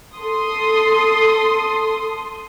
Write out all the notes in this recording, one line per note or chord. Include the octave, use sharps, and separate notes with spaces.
A4 C6 D#6